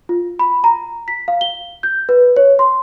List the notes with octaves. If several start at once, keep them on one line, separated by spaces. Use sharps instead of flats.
F4
B5
A#5
B6
F5
G7
G6
B4
C#5
C6